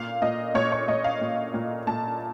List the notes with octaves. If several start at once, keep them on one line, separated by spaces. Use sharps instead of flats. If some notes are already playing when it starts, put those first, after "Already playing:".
Already playing: A#2 F5
A#2 D#5
A#2 C#5
C#5
A#2 D#5
F5
A#2
A#2
A#2 A5